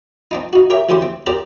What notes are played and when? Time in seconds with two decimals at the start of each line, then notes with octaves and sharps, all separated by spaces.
0.31 C4 D4 D#4
0.53 D#4 F#4
0.70 G4 A#4 C#5 E5 G5
0.89 D2 E3 C#4 G4 C5 C6
1.02 C4
1.26 C4 G4 A#4 C5 D5